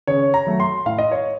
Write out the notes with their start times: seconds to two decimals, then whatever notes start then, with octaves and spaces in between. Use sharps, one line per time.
0.07 C#3 C#5
0.34 A#5
0.47 F#3 A3
0.60 C6
0.86 A2 F5
0.98 D#5
1.11 C#5